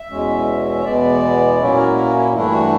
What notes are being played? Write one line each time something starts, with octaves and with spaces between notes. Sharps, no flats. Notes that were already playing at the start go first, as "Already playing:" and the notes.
Already playing: E5
E2 B2 G#3 C#4
C#5
E2 B2 G#3 B3 D5
A#2 F#3 A#3 C#4 E4
A#4
A#4
E4
G2 E3 A3 D4 E4
F#4